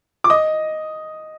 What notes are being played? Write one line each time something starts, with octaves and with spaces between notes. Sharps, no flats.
D6
D#5 D#6